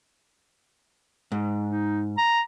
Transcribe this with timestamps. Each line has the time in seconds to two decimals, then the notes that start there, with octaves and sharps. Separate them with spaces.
1.32 G#2
1.69 D#4
2.18 A#5